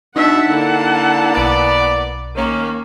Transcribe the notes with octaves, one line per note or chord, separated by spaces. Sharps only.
B2 D4 D#4 E5 F#5 A5
D3 A#3 E4
B1 B3 D5 A6
D#3 A#3 C#4